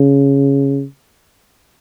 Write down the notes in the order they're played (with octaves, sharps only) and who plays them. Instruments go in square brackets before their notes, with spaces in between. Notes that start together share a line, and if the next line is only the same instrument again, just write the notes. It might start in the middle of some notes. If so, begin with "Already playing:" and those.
Already playing: [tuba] C#3